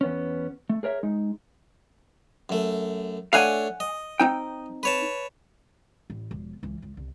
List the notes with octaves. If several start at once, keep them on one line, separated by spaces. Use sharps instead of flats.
E2 B3 C#4
A3
G#4 A#4 C#5 E5
G#3 D#4
F#2 A3
A3 D4 C#5 F5 F#5 G#5
D#5
C4 D#4 G5
B4 C#5 A5
A1
E1 F3
C#2 E3
C#2
C2